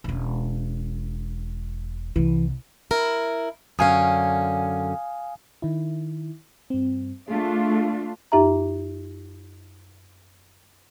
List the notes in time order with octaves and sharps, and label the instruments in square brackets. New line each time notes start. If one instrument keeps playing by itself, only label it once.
[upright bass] E1 C#4
[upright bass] C2 C3 [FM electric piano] E3
[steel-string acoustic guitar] E4 A#4
[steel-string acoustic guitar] F#2 D3 C#4 [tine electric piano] F5 G#5 D#6
[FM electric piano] D#3 E4
G2 C4
[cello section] A3 D4 F4 [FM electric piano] G#4
[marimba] F#2 D#4 G4 E5 A#5